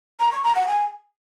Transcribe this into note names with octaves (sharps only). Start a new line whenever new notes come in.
A#5
C#6
A#5
F#5
G#5